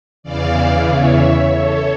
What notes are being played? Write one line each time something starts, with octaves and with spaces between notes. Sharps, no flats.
E2 C#3 E3 D5 F5
C#5 E5
A4 C#5